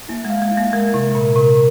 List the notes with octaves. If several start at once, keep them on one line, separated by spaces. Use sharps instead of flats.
A#3 E4
G#3
F5
G#3
E4
A#3
G#3 A#4
C3 E4
A#2 A#4
C3 A#4